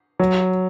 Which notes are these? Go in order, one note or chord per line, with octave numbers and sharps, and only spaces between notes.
F#3